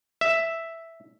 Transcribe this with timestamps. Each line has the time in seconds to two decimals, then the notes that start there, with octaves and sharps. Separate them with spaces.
0.21 E5